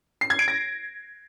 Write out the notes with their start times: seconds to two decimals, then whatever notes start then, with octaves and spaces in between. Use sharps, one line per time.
0.21 C7
0.30 G#6
0.39 D7
0.48 A#6